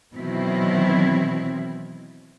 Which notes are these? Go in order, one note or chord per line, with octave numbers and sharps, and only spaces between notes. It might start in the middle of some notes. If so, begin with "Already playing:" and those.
B2 D#3 E3 F#3 C4 E4